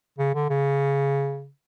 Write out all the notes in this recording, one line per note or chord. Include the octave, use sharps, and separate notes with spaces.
C#3
D3
C#3